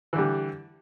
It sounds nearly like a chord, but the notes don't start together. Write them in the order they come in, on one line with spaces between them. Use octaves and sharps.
E3 D3 G3